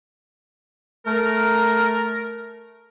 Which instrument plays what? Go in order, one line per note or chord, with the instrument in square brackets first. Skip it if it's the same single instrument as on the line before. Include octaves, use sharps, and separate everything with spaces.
[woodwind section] A3 A#4